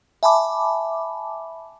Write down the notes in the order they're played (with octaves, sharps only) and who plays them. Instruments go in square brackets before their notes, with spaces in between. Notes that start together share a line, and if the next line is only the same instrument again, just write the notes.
[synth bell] E5 G#5 A5 B5 D6